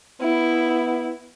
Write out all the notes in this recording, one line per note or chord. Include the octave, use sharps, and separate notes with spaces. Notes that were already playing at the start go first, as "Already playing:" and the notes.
B3 E4